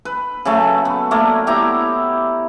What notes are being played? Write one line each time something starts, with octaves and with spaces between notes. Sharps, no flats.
B4
C#3 F#3 A3
B3
A3 A#3 A#4 D5
B3 E4 G4 A#5